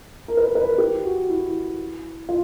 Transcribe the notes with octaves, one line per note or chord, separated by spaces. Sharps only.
A#4
B4
A#4
B4
A#4
G4
F#4
E4
F4